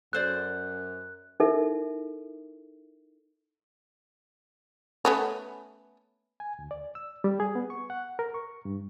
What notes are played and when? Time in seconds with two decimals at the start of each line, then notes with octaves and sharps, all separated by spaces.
0.13 F#2 A4 C5 D5 F#6
1.40 D#4 E4 A4 A#4 E5
5.05 A3 B3 C#4
6.40 G#5
6.59 D2
6.71 D5
6.95 E6
7.24 G3
7.40 G#4
7.55 B3
7.70 C#6
7.90 F#5
8.19 A#4
8.34 C#6
8.65 G2